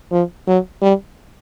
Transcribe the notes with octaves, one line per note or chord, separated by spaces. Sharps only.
F3
F#3
G3